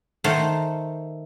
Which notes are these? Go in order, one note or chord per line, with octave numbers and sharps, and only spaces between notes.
D#3 A3 C5 F#5 A5